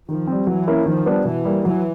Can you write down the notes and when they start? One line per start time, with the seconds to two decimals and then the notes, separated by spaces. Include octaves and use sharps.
0.09 D#3 F3
0.27 G3 C4
0.47 E3 F#3
0.67 A#3 C#4 E4
0.86 D#3 F3
1.06 G3 B3 D4
1.25 B2 E3
1.45 G3 A#3
1.64 E3 F#3